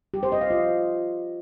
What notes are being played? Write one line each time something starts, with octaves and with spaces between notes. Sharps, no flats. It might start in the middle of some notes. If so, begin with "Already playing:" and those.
G4
C5
D#5
F5
F4